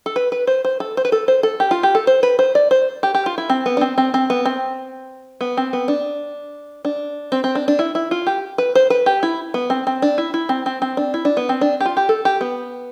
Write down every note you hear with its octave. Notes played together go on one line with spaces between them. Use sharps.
A4
B4
B4
C5
C5
A4
C5
B4
A4
C5
A4
G4
F4
G4
A4
C5
B4
C5
D5
C5
G4
G4
F4
E4
C4
B3
D4
C4
C4
C4
B3
C4
B3
C4
B3
D4
D4
C4
C4
D4
D4
E4
E4
F4
G4
B4
C5
B4
G4
E4
B3
C4
C4
D4
E4
E4
C4
C4
C4
D4
E4
D4
B3
C4
D4
G4
F4
G4
A4
G4
B3